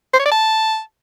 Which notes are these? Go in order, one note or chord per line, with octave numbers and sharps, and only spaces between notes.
C5
C#5
D5
A5